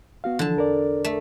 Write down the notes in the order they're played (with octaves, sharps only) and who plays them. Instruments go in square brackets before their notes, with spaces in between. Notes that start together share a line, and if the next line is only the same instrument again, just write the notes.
[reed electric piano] B3 F#4 F5
[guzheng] D3 A5 [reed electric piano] E3 F3
[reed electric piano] E2 A#4 D5
[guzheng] A3